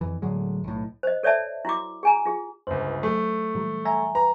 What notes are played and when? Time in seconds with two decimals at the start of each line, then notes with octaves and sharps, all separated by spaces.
0.01 F2 E3
0.22 A2 D3 F#3 G#3
0.64 B1 A2
1.03 C5 D#5
1.23 A4 C#5 D5 E5 A5
1.65 E4 F#4 D6
2.03 G#4 G#5 A#5
2.26 F4 G#4
2.67 G1 C#2 C5
3.03 F#3 A3
3.55 A#2 E3 G3
3.85 E5 G#5 A#5
4.15 B4 A#5